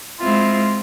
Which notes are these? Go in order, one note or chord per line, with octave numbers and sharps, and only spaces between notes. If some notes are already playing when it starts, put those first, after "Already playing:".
G#3 C4 E4 F4